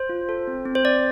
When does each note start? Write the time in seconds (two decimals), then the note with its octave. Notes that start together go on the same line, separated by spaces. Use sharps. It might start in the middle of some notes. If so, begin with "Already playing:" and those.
Already playing: C5
0.09 F4
0.29 A4
0.47 C4
0.65 C4
0.75 C5
0.84 C4 D5